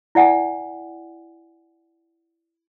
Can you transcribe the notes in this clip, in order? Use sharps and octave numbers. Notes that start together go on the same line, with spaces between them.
E4 D5 F#5 G#5